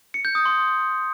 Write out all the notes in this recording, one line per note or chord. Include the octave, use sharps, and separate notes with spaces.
C#7
G6
D#6
C6